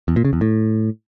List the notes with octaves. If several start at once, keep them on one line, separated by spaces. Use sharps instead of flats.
E2
A#2
C#3
E2
A2